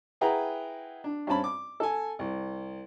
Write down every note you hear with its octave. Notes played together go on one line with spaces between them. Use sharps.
E4 G#4 B4 F#5 G5 A#5
D4
G2 C4 C#4 A5 B5
D6
A4 G#5
C2